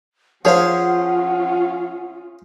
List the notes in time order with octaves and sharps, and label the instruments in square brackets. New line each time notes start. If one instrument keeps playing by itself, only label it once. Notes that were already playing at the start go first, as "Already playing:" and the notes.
[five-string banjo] F3 C#5 F5 [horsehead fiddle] C#4 F4 [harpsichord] G#4 C5 [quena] F#5